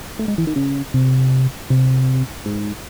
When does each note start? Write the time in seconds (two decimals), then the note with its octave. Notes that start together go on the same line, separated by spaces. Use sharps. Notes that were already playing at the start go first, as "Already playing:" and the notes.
0.19 A3
0.28 G#3
0.38 E3
0.47 D#3
0.56 C#3
0.94 C3
1.70 C3
2.46 G#2